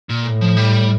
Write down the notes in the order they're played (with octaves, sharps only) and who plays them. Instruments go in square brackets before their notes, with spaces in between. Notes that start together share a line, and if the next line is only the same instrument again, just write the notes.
[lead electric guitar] A#2
[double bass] A2
[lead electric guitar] F3
G3